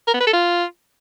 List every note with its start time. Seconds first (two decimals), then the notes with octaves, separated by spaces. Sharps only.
0.08 A#4
0.14 B3
0.20 B4
0.27 A4
0.33 F4